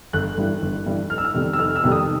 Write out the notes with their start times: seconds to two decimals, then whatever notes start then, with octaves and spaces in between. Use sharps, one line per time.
0.13 G1 F#6
0.38 G2 E3 G3
0.62 G1
0.86 G2 E3 G3
1.10 F1 F6
1.18 E6
1.25 F6
1.34 F2 C3 D#3 G3
1.53 E6
1.59 F1 F6
1.76 E6
1.84 F2 C3 D#3 G3
1.92 D#6